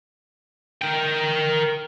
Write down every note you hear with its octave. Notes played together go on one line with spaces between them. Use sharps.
A#4 G5